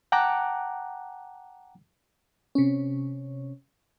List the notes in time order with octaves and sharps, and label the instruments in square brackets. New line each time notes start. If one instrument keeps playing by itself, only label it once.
[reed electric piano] F#5 G5 A5 A#5 D6 F#6
[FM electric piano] C3 C#4